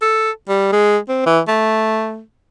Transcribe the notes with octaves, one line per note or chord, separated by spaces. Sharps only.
A4
G3
G#3
C4
E3
A3